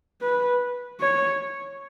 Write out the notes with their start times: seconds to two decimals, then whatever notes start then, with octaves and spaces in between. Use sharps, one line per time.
0.21 B4
1.00 C#5